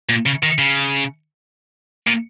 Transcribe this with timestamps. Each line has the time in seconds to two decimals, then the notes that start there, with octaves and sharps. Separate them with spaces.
0.09 A#2
0.26 C#3
0.43 D#3
0.59 C#3
2.07 A#2